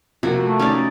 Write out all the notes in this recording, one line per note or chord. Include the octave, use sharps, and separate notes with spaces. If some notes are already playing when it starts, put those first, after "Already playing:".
C3 F3 A#3 F#4
A3
C#4 D#4 D5